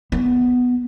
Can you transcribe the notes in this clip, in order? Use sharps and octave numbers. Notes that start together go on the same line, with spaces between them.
B3